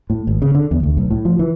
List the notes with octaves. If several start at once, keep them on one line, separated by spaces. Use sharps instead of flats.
A2
G#1
C#3
D3
E2
D2
B1
A2
F3
E3